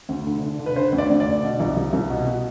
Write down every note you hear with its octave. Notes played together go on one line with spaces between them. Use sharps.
D2
D3
D3
D3
B4
D3 C5
D2
D5
D2
D5
D3
B2
C2
C2
C2
B2
B2